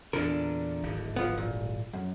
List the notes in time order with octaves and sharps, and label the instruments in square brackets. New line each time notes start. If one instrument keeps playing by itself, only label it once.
[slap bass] E2 A#2 D3 [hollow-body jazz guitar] D4 A#4
[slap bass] D1 G#1 D3
[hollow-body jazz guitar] F3 B3
A#2
F#2